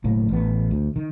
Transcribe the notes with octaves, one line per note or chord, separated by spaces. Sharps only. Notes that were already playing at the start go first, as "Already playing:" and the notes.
F#1 A2 A#3
A1 B3
D2
D#3